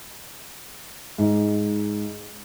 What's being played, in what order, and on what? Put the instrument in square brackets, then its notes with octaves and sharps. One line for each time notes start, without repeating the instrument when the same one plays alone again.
[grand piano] G#2